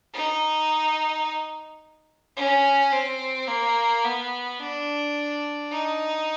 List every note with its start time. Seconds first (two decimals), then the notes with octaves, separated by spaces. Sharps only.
0.13 D#4
2.37 C#4
2.92 C4
3.48 A#3
4.04 B3
4.59 D4
5.71 D#4